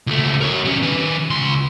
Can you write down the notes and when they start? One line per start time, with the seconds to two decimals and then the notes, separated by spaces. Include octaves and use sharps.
0.07 C#2 A3
0.41 A#4 C#5
0.65 G3 C#4
0.82 D#3 B4
1.30 C#2 C6